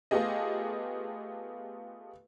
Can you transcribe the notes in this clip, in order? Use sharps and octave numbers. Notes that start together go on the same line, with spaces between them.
A3 B3 F4 G4 G#4 D#5